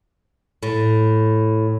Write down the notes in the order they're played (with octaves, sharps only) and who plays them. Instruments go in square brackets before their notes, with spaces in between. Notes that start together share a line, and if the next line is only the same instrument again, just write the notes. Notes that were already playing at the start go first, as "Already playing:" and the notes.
[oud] A2